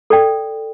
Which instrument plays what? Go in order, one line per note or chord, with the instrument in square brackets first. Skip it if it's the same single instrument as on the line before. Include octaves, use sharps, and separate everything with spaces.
[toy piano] A4 D5 G5